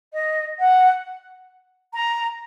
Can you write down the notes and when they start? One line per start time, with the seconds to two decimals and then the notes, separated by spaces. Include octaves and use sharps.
0.13 D#5
0.59 F#5
1.94 A#5